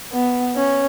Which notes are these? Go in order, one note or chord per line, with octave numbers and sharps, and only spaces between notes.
B3
C#4